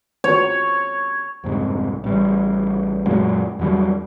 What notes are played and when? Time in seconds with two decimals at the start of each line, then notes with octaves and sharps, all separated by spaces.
0.24 C#5
1.44 C2 F2 G#2
2.04 A1 G3
3.07 F#2 A#2 F#3 G#3
3.59 E2 F#3 G3